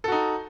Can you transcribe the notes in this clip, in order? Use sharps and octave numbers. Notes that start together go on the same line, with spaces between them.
D#4 F#4 A4